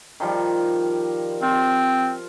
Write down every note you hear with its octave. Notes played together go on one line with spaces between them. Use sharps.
D#3 F3 G3
C4 F4